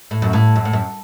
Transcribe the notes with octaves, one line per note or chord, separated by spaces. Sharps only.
A2
F#2
A2
F#2
A2
F#2